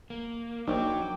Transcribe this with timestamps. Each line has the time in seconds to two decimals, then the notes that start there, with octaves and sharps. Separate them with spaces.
0.10 A#3
0.68 A#1 F#3 D#4 G5 D6